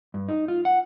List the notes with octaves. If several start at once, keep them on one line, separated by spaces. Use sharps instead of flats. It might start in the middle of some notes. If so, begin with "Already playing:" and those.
G2
D#4
F4
F#5